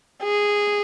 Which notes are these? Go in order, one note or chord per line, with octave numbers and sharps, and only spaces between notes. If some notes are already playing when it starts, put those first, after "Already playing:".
G#4